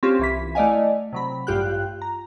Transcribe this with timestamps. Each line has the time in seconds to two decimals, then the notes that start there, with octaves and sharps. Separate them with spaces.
0.03 C4 C#4 F4 G4
0.19 C2 E3 B6
0.55 A3 E4 D5 D#5 F5 G#5
1.13 C3 F#3 B5
1.47 A1 G2 F4 G4 G5 F#6
2.02 A#5